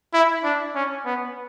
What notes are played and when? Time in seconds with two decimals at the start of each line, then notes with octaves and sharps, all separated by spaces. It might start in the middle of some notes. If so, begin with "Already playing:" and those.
0.13 E4
0.44 D4
0.75 C#4
1.05 B3